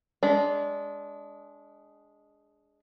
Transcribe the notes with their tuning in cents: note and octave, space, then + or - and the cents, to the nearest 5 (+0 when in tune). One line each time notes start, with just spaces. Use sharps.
G#3 +0 D4 -20